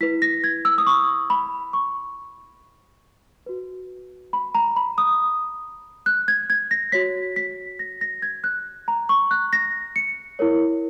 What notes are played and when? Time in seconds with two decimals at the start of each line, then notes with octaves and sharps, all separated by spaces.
0.01 E4 B4 B6
0.22 A#6
0.44 G#6
0.65 E6
0.78 D#6
0.87 C#6
1.30 B5
1.73 C#6
3.46 F#4 B4
4.33 B5
4.55 A#5
4.76 B5
4.98 D#6
6.06 F#6
6.28 G#6
6.50 G#6
6.71 A#6
6.92 F#4 C#5 B6
7.36 B6
7.79 A#6
8.01 A#6
8.22 G#6
8.44 F#6
8.88 A#5
9.09 C#6
9.31 F#6
9.53 A#6
9.96 C#7
10.39 E4 A#4 C#5